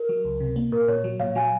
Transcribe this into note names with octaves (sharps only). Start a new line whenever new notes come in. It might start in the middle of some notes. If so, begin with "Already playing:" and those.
Already playing: A#4
F#3
C#2
C3
A#3
A#2 A#4
A#2 C#5
F#3
A#2 C#5 F5
F#3 F5 G#5